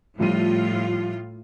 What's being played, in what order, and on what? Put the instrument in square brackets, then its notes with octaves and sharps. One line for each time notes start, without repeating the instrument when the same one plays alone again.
[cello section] A2 F4 [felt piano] F3 G3 D#7